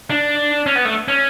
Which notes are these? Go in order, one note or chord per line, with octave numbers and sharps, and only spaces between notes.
D4
C#4
B3
A3
C#4